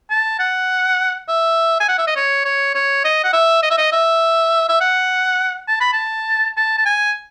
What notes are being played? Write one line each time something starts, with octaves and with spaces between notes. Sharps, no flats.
A5
F#5
E5
G#5
F#5
E5
D#5
C#5
C#5
C#5
D#5
F#5
E5
D#5
E5
D#5
E5
E5
F#5
A5
B5
A5
A5
A5
G#5